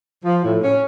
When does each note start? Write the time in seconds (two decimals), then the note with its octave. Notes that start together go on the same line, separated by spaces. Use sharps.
0.24 F3
0.43 A2
0.63 C#4